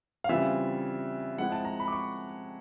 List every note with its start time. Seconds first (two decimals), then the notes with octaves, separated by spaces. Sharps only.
0.24 F5
0.29 C#3 E3 G3 C4 F4 E5
1.38 F3 G#3 C4 E4 F#5
1.52 A5
1.65 A#5
1.80 B5
1.88 D6
1.93 C#6